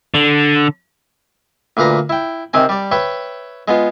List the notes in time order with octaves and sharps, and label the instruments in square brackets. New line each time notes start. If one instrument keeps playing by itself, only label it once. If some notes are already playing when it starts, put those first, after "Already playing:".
[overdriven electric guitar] D3
[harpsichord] D2 A#2 B4 F5 A#5
E4 G5
C3 D#3 C4 G#5
G3 D5
B4 C#5 E5 G5 B5
G#3 B3 F4